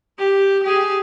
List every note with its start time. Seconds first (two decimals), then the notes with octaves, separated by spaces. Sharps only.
0.19 G4
0.63 G4 G#4